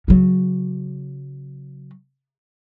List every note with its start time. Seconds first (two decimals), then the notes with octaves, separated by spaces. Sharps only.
0.08 C#3 F#3